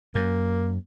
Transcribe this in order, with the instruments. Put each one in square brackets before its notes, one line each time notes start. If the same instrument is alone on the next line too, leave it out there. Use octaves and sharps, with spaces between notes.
[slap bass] F#2 [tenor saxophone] A#3